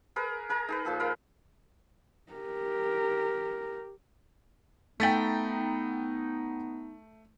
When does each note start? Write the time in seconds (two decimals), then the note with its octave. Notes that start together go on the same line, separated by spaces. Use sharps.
0.16 G#4 A#4 B4
0.49 G#4 A#4 A5 A#5
0.68 D#4 G#4 B4
0.85 A#2 F3 G#4 A5
1.00 A#4 B4 F5
2.32 G4 A#4
5.00 A3 B3 D#4 G5 A6 B6